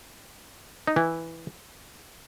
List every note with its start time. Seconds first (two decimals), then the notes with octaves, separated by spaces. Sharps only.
0.87 D#4
0.96 E3 E4